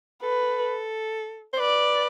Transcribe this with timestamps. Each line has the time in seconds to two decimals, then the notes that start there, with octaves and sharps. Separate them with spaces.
0.23 A4 B4
1.53 C5
1.59 B4 D5